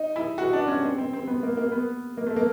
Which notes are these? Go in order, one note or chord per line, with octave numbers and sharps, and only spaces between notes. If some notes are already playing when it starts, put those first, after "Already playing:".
Already playing: D#4
E4
F#4
D4
C#4
C4
C4
C4
B3
A#3
A#3
B3
A#3
A3
A#3